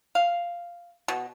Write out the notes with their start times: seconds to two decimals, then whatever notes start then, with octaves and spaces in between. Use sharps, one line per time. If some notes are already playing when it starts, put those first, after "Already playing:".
0.15 F5
1.08 B2